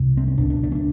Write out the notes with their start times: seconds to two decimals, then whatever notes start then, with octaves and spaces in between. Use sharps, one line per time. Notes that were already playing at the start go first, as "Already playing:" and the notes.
Already playing: C2 C3
0.17 C4
0.28 C#4
0.38 C#2 B2 D4
0.50 D4
0.63 D4
0.72 C#4
0.75 D4